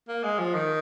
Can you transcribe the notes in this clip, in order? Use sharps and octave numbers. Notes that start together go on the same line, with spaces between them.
A#3
G#3
F3
D#3